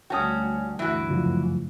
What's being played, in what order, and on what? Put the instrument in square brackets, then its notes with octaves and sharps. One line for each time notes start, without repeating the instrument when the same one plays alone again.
[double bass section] D2 G3 [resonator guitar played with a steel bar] C#4 F#4 [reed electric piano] G5 A5 D#6
[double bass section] D2 G2 [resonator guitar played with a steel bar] E3 F#4
[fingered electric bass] C#2 F#2 F3 [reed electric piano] C#3